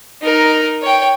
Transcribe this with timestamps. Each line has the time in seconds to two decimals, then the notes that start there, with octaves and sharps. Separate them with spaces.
0.22 D#4 A#4
0.82 C#5 G5